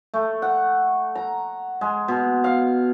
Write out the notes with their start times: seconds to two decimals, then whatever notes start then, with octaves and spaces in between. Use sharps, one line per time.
0.14 A3
0.42 F#5
1.15 A#5
1.81 G#3
2.08 B2
2.44 F5